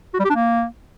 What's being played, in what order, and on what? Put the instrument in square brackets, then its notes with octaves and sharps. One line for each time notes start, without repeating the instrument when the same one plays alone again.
[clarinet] F#4
G3
G4
D4
A#3